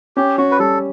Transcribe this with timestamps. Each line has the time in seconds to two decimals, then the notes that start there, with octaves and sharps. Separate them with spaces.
0.17 C#4 G4
0.38 C#4 F#4
0.51 B4
0.59 G3 A4